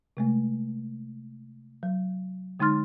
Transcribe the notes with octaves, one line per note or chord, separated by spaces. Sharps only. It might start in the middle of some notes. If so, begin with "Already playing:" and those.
C3 G#3 A3
F#3
D3 G#3 D#4 C6 F6 A6